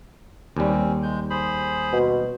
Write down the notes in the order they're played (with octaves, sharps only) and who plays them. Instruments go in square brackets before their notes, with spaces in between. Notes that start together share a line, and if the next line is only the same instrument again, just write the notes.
[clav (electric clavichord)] D#2 G3 [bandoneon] C4 C#4
[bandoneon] G#3 G6
G#4 C5 B5
[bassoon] B2